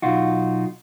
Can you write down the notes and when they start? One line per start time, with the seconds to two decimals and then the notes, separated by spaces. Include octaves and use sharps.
0.02 B1 D#4 F4 F#4